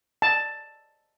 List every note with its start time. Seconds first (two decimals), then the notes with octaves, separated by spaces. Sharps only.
0.22 A5